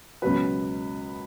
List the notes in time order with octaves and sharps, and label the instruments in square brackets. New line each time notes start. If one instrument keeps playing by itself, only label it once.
[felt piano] C#2 B2 F#3 B4